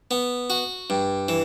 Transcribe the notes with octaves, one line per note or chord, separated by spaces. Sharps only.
B3
F#4
G2
E3